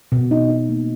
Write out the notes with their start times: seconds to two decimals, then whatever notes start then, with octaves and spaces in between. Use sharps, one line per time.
0.12 B2
0.31 D#4
0.50 D#4
0.69 A#3